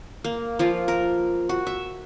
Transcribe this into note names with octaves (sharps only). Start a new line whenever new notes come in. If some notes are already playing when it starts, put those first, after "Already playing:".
A#3
F3 A#3 F4
A#4
F#4
E5